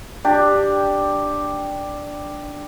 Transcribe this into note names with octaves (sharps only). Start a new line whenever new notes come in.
D4 G4